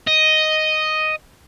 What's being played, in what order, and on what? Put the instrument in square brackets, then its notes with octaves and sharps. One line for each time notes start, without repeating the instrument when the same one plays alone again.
[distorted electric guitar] D#5